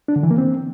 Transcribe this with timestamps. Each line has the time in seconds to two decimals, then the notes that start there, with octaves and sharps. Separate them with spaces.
0.08 D4
0.16 D3
0.23 E3
0.31 A#3
0.38 C4